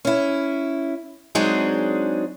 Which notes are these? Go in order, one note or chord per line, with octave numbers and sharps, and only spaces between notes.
C#4 E4
F#3 G#3 C4 D4 D#4 G#4